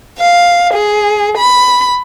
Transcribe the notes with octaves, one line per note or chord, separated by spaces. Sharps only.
F5
G#4
B5